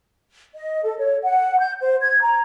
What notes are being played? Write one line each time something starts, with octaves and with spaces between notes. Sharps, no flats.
D#5
A4
C#5
F#5
G6
C5
G#6
A#5